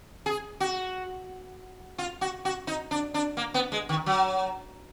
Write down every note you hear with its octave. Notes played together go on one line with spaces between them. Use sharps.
G#4
F#4
F4
F#4
F#4
D#4
D4
D4
A#3
B3
G#3
D#3
F#3